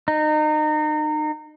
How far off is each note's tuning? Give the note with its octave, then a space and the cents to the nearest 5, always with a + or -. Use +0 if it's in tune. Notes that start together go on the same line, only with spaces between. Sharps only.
D#4 -30